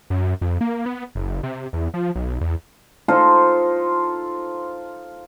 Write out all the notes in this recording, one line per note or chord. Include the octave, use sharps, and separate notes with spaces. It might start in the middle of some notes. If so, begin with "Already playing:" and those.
F#2
F2
A#3
B3
F#1
C3
E2
F3
B1
E2
D#4 F4 A4 C5